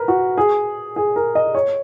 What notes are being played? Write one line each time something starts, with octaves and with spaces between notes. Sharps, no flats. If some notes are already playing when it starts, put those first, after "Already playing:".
Already playing: A#4 B4
F#4
G#4
G#4
A#4
D#5
C#5